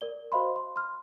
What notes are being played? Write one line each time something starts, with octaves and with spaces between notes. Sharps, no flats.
A#4 D5 G7
F#4 C5 D#5 F5 B5 C6
C6
C6 F6